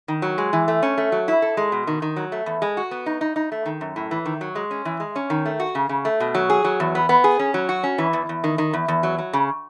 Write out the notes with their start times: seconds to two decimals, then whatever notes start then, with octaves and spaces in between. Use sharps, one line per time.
0.08 D#3
0.22 F#3
0.38 G#3
0.53 E3
0.68 A3
0.83 C#4
0.98 A3
1.12 F#3
1.28 E4
1.42 A4
1.57 G#3
1.72 B2
1.87 D#3
2.02 D#3
2.16 F#3
2.32 A3
2.46 E2
2.62 G#3
2.77 F#4
2.91 B3
3.06 D#4
3.21 D#4
3.36 D#4
3.52 A3
3.66 D#3
3.81 F#2
3.96 A2
4.11 E3
4.25 D#3
4.41 F#3
4.55 G#3
4.71 C#4
4.85 E3
5.00 G#3
5.16 C#4
5.30 D#3
5.46 A3
5.60 F#4
5.75 C#3
5.89 C#3
6.05 A3
6.20 B2
6.35 F#3
6.50 G#4
6.64 F#3
6.80 E2
6.95 B3
7.09 B3
7.24 G#4
7.39 C#4
7.54 F#3
7.69 F#4
7.83 C#4
7.98 E3
8.13 E2
8.29 E2
8.44 D#3
8.58 D#3
8.73 E2
8.88 E2
9.03 F#3
9.18 F#3
9.33 C#3